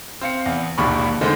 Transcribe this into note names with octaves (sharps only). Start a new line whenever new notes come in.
C4 F5 C#7
E2
E1 A#1 D#2 G4 B5 C#6
D3 D#3 G#3 A3 C5